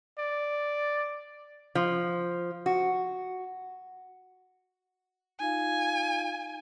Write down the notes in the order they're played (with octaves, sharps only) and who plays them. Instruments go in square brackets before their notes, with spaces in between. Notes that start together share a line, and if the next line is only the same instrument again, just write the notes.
[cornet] D5
[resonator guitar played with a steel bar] F3
F#4
[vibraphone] D#4 F4 F5 [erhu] G#5